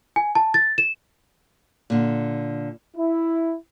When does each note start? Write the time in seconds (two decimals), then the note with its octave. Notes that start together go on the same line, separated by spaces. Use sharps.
0.16 G#5
0.35 A5
0.54 A6
0.78 E7
1.90 A#2 D3
2.96 E4